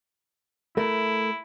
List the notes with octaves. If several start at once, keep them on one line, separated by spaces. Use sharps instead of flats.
A3 E4 A#4